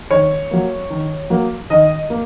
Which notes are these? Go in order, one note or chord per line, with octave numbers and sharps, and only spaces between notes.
D#3 C#5
F#3 A#3
D#3
F#3 A#3
D#3 D#5
A#3